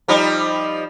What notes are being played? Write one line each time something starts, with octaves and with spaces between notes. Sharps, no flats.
F3 G3 D#4